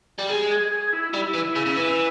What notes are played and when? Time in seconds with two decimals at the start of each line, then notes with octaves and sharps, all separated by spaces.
0.19 G3
0.29 G#3
0.51 G#4
0.72 G#4
0.93 E4
1.13 G3 E4
1.34 E3
1.56 C#3
1.66 C#3
1.76 E3